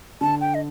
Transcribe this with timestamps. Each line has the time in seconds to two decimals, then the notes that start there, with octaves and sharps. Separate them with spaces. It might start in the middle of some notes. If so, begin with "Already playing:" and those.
0.21 D3 A5
0.41 G5
0.55 D#5